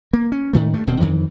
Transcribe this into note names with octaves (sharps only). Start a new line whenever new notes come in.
A#3
C#4
A2 D#3 A3
G2 A3
D#1 B2 C4
F2 D#3 E3